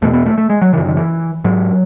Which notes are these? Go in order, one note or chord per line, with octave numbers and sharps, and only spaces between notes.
E2 B2 A3
B3
A3
A3
G#3
F#3
F#2 C#3 E3
D#3
E3
G#2 F#3